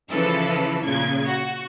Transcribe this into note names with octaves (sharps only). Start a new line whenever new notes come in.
C#3 E3 F3 A4 B4
A#2 C#3 G#6
F#4